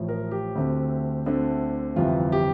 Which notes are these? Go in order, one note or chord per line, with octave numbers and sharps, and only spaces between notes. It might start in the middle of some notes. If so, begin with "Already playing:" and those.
Already playing: A1 A2 F3
A#4
G4
D2 D3 A3 C4
D2 D3 A3 C4
G1 F2 C3 E3 F4
G4